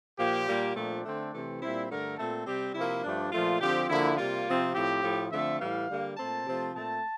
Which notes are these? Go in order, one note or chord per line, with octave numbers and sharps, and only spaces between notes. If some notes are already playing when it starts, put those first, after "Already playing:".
A#2 F3 A#3 G4
A#2 G3 A#3
A#2 F3 A3 C4 D4
D3 A3 C4
C3 E3 A3 C4
A#2 G3 C4 E4
G2 D3 A3 A#4
A#2 A3 C4 A4
C3 G3 C4 G4
C3 F3 A#3 E4
G2 F3 A3 D4
A#2 F3 A3 F4
D3 F3 C4 G4
D3 F3 A#3 E4
C3 G3 A#3 F4
C3 F3 C4
A2 F3 C4 G4
A2 F3 A3
D3 F3 A3 C4 E5
A2 E3 G3 F5
D3 G3 A#3
A#2 A3 C4 A5
C3 F3 A3 C4
A#2 A3 C4 A5